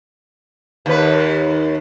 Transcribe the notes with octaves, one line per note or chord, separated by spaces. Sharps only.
D#2 B4